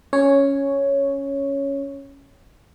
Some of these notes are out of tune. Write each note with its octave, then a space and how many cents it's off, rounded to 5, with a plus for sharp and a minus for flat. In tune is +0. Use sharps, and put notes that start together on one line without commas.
C#4 +0 C#5 +0